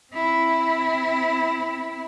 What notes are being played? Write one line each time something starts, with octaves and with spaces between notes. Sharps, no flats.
C4 E4